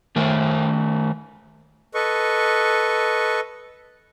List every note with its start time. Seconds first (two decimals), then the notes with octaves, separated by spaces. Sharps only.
0.16 D#3 A3 A#4
1.94 A4 B4 D#5 C#6